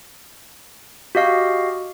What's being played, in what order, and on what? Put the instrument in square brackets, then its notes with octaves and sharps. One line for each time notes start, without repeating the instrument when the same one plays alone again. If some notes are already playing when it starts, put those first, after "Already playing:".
[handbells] F#4 G4 D#5 F5